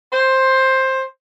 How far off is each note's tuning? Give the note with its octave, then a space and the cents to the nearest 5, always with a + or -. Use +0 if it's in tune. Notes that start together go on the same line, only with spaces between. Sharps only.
C5 +10